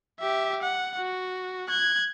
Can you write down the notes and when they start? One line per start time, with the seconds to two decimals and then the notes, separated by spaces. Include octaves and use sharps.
0.20 G4 E5
0.62 F#5
0.98 F#4
1.69 F#6 G#6